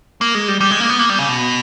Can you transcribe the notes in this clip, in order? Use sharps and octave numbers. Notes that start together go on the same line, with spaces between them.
A#3
G#3
G3
G3
G#3
A#3
B3
A#3
G3
C#3
B2